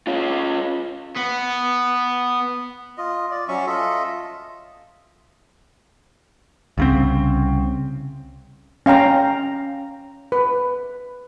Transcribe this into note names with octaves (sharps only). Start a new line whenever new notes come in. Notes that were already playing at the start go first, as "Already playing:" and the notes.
C#4 F4
B3
F4 D#5
D5
F#3 C#4 E5 C#6
F4 A4 D#5 E5
C2 C#3 C4
C#4 F5 G5 A#5
B4